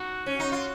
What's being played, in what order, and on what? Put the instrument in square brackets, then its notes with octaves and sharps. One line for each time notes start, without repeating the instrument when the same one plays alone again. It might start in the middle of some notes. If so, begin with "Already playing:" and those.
Already playing: [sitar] D#4 [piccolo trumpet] F#4
[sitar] C#4
[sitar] D#4 [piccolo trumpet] F#4
[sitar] F4